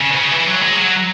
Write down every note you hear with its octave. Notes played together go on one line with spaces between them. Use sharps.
C#3
B2
C#3
E3
F#3
G#3
F#3